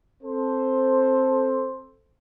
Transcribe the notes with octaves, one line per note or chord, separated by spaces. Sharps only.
C4 A4 C5